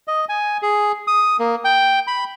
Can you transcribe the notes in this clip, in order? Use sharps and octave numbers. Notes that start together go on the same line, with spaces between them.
D#5
G#5
G#4
D#6
A#3
G5
B5